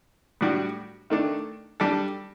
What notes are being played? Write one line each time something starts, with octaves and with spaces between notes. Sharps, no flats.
A2 G3 D4 F#4
D#3 A3 D4
G3 D4 A4